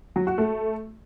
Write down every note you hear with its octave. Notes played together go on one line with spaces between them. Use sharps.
F#3
F#4
A3